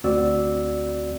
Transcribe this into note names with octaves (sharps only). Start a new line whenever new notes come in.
D2 C4 F#4 D5 E6